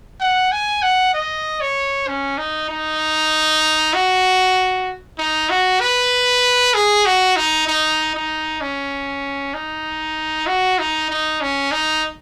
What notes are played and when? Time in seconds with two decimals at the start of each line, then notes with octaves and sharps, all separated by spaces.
0.20 F#5
0.51 G#5
0.82 F#5
1.13 D#5
1.60 C#5
2.07 C#4
2.38 D#4
2.69 D#4
3.93 F#4
5.18 D#4
5.49 F#4
5.80 B4
6.74 G#4
7.05 F#4
7.36 D#4
7.67 D#4
8.14 D#4
8.61 C#4
9.54 D#4
10.47 F#4
10.79 D#4
11.09 D#4
11.41 C#4
11.71 D#4